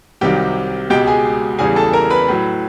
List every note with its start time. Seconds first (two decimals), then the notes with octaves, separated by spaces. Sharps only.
0.21 C2 C3 D#3 F#3 G4 G5
0.90 C#2 B2 G#3 G4 G5
1.07 G#4 G#5
1.59 E2 C#3 E3 G3 G#4 G#5
1.76 A4 A5
1.93 A#4 A#5
2.10 B4 B5
2.28 A2 F#3